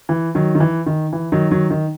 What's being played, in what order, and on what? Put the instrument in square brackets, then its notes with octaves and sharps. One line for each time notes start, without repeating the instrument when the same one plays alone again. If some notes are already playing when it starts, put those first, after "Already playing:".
[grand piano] E3
D#3 F#3
D#3
E3
D#3
E3
D#3 F#3
D#3 F#3
D#3